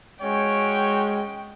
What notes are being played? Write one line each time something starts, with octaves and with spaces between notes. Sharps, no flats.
G#3 C#4 F#4 C#5 G5